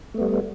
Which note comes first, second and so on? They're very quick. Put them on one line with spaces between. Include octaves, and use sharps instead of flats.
A3 B3 G3